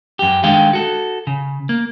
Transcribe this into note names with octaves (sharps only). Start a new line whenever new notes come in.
F#2 G4
D3 D#3 G#3 F5 G5
F#4 A4
C#3
A#3